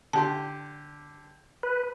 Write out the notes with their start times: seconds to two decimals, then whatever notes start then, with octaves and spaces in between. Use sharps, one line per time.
0.13 D3 G4 A5 C6
1.63 B4